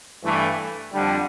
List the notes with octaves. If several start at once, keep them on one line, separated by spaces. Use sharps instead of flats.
G2 E3 A3
F2 D3 G3